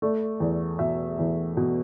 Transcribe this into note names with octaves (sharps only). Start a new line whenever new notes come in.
A3 D5
E2
B2 E5
E2
B2